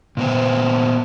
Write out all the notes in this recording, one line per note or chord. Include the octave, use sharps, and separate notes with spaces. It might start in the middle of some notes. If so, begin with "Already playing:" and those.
A#2 B3 C5